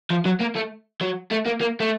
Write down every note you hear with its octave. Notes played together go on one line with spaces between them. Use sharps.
F3
F#3
A#3
A3
F#3
A3
A#3
A#3
A3